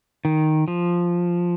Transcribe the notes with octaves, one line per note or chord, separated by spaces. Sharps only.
D#3
F3